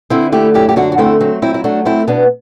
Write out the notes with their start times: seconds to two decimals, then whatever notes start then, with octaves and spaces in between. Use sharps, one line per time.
0.10 D3 C4 E4
0.32 A3 E4 G4
0.54 F#2 E4 G4
0.69 G4
0.76 D3 D4 F#4
0.92 F#4
0.98 A3 C4 E4
1.21 F#3 C4
1.42 F#3 C4 E4
1.54 E4
1.64 A3 D4 F#4
1.85 A3 C4 E4
2.07 B2 B3 D4